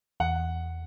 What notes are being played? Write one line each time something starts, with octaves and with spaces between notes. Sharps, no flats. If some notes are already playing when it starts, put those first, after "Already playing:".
E2 F#5